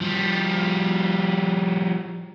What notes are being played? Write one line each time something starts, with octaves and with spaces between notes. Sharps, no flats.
F3 G3